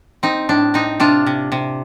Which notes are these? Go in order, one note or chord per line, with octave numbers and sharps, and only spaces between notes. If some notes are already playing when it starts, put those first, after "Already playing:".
C4 D#4
A2 D4
C4 D#4
C3 D4 F4
C3
C3